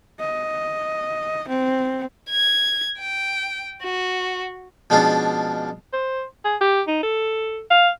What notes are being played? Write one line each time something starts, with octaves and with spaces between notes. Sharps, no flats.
D#5
C4
G#6
G5
F#4
B2 F3 G#3 C#4 D4 F4
C5
G#4
G4
D#4
A4
F5